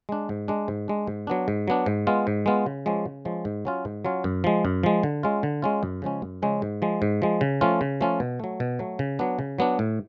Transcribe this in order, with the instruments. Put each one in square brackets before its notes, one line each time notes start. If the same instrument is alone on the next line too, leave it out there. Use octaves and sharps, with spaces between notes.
[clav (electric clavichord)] G#3 D4
G#2
G#3 D4
G#2
G#3 D4
G#2
F#3 B3 D4
G#2
F#3 B3 D4
G#2
G#3 B3 F4
G#2
G#3 B3 F4
C#3
F3 G#3 C#4
C#3
F3 G#3 C#4
G#2
F#3 C#4 F4
G#2
F#3 C#4 F4
F#2
F3 G#3
F#2
F3 G#3
D3
G#3 C#4 F4
D3
G#3 C#4 F4
F#2
C#3 F3 G#3 C#4
F#2
C#3 F3 G#3 C#4
G#2
F3 G#3
G#2
F3 G#3
C#3
F3 A3 C#4 F4
C#3
F3 A3 C#4 F4
B2
F#3 A3
B2
F#3 A3
C#3
F#3 B3 D4
C#3
F#3 B3 D4
A2